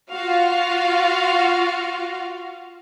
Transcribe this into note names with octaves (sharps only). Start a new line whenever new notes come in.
F4 F#4 F5